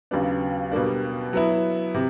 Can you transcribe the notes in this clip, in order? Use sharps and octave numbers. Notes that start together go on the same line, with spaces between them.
D#2 C#3 F#3 B3 D4
B2 G3 A#3 D4
F#3 B3 E4
C3